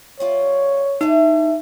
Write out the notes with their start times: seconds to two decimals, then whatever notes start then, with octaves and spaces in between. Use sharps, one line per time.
0.20 G3 F4 C#5 D5
1.01 A3 D#4 E4 G#4